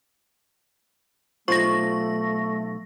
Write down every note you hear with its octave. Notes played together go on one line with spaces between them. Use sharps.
B1 A3 F4 C5 C#6 A#6